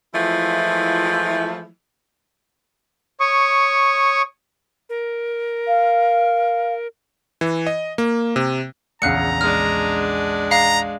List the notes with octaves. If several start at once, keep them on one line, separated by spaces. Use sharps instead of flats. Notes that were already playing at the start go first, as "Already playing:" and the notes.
E3 F3 G#3 A3 E4 F4
C#5 C#6 D#6
A#4
F5
E3
D#5
A#3
C3
A#1 E2 C#3 F5 A#5 F#6 C#7
G#3 D4 F6
F5 A#5